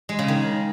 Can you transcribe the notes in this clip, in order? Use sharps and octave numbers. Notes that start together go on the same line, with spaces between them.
G#3
C#3
D#3